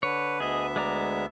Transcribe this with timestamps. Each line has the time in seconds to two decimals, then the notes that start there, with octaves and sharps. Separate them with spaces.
0.03 D3 B4 C#5
0.40 D2 B3 G#4 D#5 E5
0.76 G#3 D5 A#5